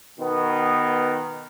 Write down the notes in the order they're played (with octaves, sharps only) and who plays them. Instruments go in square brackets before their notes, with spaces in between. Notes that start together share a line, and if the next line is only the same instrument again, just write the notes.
[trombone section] B2 D#3 B3